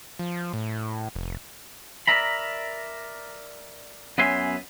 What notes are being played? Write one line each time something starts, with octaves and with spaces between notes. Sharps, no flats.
F3
A2
F1
A#4 D5 E5 A#5 B5
F#2 B3 C#4 E5 G#5 C6